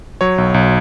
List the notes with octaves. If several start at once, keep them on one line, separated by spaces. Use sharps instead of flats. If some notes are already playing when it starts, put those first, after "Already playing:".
F#3 C#5
B1
B1